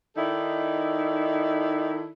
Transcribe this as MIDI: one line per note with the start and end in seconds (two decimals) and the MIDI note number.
0.16 2.09 51
0.16 2.09 63
0.16 2.09 64
0.16 2.09 69
0.16 2.09 74